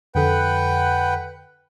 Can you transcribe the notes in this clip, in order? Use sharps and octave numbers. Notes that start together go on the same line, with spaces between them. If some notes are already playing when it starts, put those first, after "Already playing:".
F2 D3 A4 B4 F#5 G5